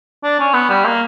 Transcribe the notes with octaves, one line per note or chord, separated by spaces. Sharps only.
D4
C#4
B3
G3
A#3